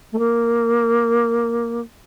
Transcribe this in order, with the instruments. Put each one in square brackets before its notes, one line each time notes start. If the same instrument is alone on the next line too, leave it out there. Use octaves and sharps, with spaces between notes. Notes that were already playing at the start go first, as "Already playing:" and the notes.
[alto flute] A3
A#3